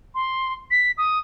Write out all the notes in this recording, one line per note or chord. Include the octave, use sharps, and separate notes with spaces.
C6
B6
D#6